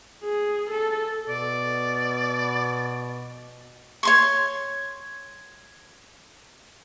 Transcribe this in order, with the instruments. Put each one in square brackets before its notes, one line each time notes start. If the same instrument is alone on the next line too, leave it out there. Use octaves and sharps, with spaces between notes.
[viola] G#4
A4
[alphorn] B2 [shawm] D5
[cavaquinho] C#5 C6 C#6